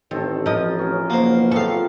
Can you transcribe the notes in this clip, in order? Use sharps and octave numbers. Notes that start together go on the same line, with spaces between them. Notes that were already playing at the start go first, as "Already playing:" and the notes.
A1 D#3 C4 A4
F3 A#4 D#5
A1 C#4 G#4
F#1 B2 A#3 C5
C3 D#3 F3 A4 F5 C#6